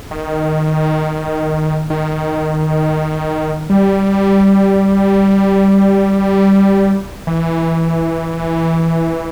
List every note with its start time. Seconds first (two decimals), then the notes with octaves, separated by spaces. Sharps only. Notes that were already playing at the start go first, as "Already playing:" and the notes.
0.11 D#3
1.90 D#3
3.70 G3
7.27 E3